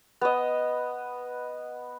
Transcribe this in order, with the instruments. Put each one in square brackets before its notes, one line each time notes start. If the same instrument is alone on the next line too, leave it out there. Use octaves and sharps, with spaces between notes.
[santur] B3 D#5